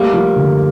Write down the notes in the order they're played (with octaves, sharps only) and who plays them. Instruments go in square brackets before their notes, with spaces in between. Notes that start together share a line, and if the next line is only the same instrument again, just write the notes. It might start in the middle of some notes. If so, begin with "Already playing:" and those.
Already playing: [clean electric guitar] G3 A#3 [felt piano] A3
[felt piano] F3
D3